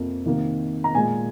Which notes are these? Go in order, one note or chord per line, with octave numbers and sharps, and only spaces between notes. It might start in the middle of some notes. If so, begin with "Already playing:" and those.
Already playing: F2 C3 A#3
C3 D#3 A#3
A#5
A#2 G#3 G#5